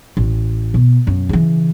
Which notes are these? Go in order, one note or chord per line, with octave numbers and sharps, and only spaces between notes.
A1
B2
F#2
C#3 E3